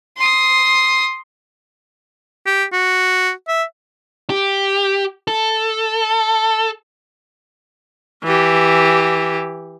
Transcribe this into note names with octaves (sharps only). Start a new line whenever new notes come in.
C6 D#6
G4
F#4
E5
G4
A4
E3 G4